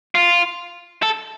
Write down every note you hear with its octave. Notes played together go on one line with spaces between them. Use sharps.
F4
A4